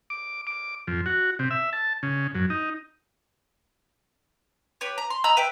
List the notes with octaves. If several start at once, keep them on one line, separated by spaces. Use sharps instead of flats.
D6
D6
F2
F#4
C3
E5
A5
C#3
F#2
D#4
G4 B4 C#5
A#5
C6
D#5 A#5 B5 E6
B4 E5 G5